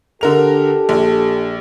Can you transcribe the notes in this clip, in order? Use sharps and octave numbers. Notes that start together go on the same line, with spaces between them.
D3 D4 G4 A4 A#4 F7
A#1